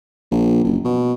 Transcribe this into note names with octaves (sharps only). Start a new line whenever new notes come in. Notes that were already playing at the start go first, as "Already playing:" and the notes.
A#1
F#1
B2